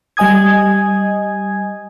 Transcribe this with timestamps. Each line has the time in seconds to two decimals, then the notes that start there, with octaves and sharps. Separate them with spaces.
0.17 G3 D#5 G#5 D#6 G#6